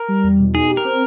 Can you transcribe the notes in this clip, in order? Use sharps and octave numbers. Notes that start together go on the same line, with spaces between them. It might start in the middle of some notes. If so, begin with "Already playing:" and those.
Already playing: A#4
G3
E2
B2
D#4 G#4
G4
A#4
C4